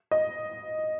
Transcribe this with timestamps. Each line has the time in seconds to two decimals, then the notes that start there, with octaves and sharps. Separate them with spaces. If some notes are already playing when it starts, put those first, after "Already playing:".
0.11 D#5